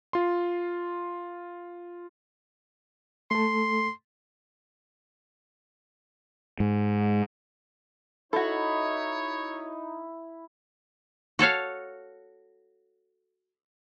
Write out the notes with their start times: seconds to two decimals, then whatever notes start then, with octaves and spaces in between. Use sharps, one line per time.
0.13 F4 C6
3.31 A3 A4 C6
6.60 G#2
8.33 D#4 E4 F#4 A4 C#5
11.39 F#4 A4 C#5 F5